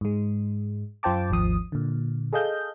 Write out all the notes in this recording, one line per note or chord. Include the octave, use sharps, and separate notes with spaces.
G#2 G#3
F#2 F4 C5 G5 A5 D6
G#1 D#2 F3 D#6
A#2 D3
G#4 A4 D#5 F5 G6